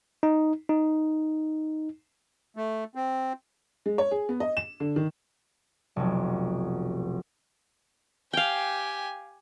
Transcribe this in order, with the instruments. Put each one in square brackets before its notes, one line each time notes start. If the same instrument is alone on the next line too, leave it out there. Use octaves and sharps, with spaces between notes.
[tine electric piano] D#4
D#4
[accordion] A3
C4
[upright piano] G#3
C#5
G#4
B3
D#5
E7
D3
D#3
[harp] F1 B1
[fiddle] G4 G#5 [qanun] F5 G5